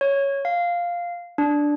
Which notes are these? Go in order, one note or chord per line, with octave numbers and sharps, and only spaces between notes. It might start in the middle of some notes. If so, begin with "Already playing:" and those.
C#5
F5
D4